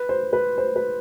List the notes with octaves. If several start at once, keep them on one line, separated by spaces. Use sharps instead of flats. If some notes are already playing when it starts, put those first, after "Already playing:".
Already playing: B4
C5
B4
C5
B4